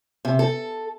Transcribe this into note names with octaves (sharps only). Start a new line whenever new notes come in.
C3
A4